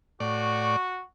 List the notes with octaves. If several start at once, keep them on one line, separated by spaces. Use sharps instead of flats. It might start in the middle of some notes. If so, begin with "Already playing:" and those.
A2 F#4 D5 C#6